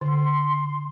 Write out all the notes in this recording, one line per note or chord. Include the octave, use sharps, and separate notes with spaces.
D3 C6